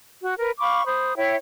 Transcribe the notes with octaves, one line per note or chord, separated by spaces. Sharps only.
F#4
A#4 B4
F5 B5 C#6 D6
C5 B5 D#6
E4 C#5 E5 G5